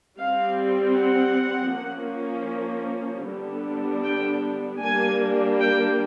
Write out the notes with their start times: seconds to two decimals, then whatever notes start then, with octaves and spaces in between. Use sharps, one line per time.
0.17 G3 C4 F5
0.94 F#5
1.71 F3 A#3 C#4
3.26 D3 G3 B3 D4
4.04 G5
4.82 G3 A#3 D4 G#5
5.59 G5